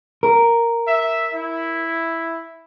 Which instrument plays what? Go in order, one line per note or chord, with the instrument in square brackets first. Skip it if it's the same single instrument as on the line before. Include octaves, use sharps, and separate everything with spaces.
[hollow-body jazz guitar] A#4
[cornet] E5
E4